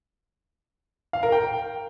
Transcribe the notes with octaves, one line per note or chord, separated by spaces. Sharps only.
F5
A#4
G5